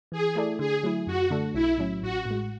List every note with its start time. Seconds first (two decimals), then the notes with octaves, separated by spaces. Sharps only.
0.12 E3 G#4
0.35 A3 E4 A4 D5
0.59 D3 G#4
0.83 F#3 A3 E4
1.07 F#2 F#4
1.30 D3 A3 D4 A4
1.54 B1 E4
1.78 A2 F#3 C#4
2.02 A1 F#4
2.25 A2
2.31 G#3